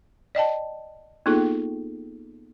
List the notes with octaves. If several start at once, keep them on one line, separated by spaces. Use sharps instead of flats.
D5 D#5 G5 A5
A#3 B3 D#4 F4 G#4 A4